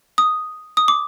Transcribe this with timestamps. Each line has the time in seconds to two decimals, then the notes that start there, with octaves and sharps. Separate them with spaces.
0.18 D#6
0.77 D#6
0.88 D6